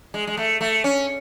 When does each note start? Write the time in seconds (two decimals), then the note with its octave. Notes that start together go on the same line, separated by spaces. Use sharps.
0.14 G#3
0.27 G#3
0.37 A3
0.61 A3
0.84 C#4